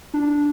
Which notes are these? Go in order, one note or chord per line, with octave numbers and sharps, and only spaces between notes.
D4